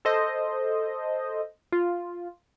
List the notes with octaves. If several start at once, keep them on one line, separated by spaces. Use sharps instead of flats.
A4 C5 D#5
F4